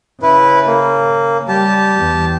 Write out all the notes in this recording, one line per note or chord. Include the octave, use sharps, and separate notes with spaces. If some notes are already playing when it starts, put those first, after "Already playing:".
C#3 E4 B4
A#3
G3 G4 A5
E2